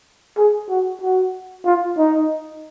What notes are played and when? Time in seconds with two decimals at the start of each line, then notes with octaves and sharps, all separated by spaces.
0.37 G#4
0.69 F#4
1.02 F#4
1.65 F4
1.97 D#4